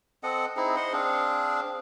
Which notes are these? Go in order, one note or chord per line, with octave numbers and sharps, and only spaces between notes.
C4 A4 D#5 F#5
C4 D#4 E4 G#4
C5 D#5 F#5 C6
C4 D4 G#4 F5